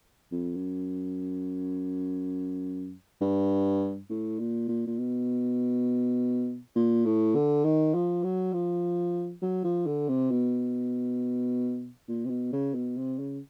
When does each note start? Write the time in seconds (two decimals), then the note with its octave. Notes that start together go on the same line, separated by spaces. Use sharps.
0.32 F2
0.55 F#2
3.21 G2
4.09 A2
4.39 A#2
4.68 A#2
4.87 A#2
4.99 B2
6.76 A#2
7.05 A2
7.35 D3
7.64 D#3
7.94 F3
8.24 F#3
8.53 F3
9.42 F#3
9.64 F3
9.86 D3
10.08 C3
10.31 B2
12.08 A#2
12.25 C3
12.30 B2
12.52 C#3
12.75 B2
12.97 C3
13.19 C#3